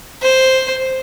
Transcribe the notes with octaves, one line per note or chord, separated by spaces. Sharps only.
C5